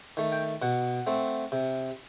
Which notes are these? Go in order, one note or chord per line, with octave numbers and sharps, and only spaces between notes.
D#3 A3
G5
B2 F#5
A3 C4
C3